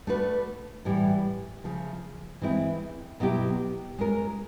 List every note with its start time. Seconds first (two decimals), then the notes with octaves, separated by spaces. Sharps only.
0.07 A3 D4 F#4 B4
0.85 A2 E3 G3
1.64 C#3 F3 A3
2.42 E3 G#3 C4 E4
3.20 B2 F#3 B3 E4 G4
3.98 G#3 C#4 F4 A#4